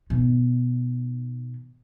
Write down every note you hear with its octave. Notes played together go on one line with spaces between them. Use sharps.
B2 D#3